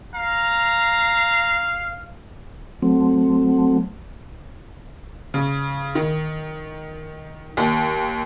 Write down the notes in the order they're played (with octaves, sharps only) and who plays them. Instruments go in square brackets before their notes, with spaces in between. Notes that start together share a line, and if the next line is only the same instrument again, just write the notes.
[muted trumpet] F5 [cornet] A#5
[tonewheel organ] F#3 A3 C4
[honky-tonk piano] C#3
D#3
D#2